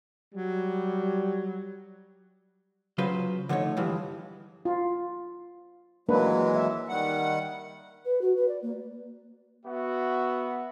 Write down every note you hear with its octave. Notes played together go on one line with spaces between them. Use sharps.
F#3 G3
C#3 F#3 F4 B4 C5
D3 F3 A3 D#4 C#5
G2 E3 F3 G#3
F4
E3 F#3 G#3 A#3 D4 B4
E5
D#3 G3 F#5
B4
F#4
B4
D5
A#3
B3 F#4 E5